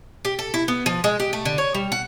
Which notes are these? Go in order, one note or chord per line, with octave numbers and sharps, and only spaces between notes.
G4
A4
E4
B3
F3
G#3
G4
A3
D3
C#5
G3
F#5